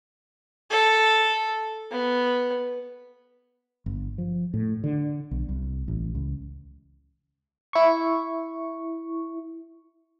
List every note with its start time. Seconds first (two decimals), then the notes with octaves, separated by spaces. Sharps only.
0.71 A4
1.91 B3
3.86 G1
4.18 F3
4.54 A2
4.84 D3
5.31 B1
5.49 C2
5.88 A1
6.15 C#2
7.73 E4 C#6